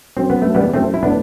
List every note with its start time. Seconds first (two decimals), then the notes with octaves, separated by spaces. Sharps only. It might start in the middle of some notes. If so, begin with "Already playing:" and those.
0.16 F#2 C4
0.30 B3
0.42 F#2 A3
0.55 G3 B3
0.62 E2
0.74 F#2 A3 C4
0.94 E4
1.03 A2 B3 D4